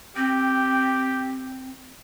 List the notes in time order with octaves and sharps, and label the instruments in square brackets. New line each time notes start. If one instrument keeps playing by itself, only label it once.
[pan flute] C4 [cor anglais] G4